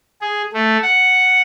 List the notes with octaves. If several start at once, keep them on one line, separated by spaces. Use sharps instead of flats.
G#4
A3
F#5